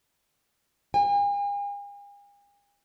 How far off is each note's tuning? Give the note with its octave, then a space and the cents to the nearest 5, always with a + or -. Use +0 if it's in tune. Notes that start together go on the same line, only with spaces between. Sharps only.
G#5 -45